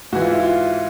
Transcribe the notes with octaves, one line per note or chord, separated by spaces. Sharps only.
G#2 E3 F#4
F4
E4
F4